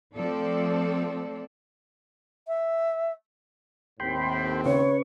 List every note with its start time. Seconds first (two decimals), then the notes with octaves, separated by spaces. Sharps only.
0.16 F3 A3 C4 A4 D5
2.47 E5
4.00 D#2 A2 C4 G5 B5 C6
4.66 C#3 B4 C#5 C#6